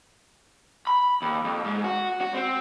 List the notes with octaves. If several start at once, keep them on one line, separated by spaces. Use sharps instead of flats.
B5
D#2
F2
G#2
F#4
F#4
C4